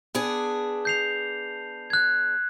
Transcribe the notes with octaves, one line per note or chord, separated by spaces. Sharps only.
B3 D4 G#4
G6 C7 F7
F#6 G#6